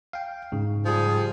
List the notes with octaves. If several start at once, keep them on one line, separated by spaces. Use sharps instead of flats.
F5 G5
G#2 C#3
F3 G3 G#4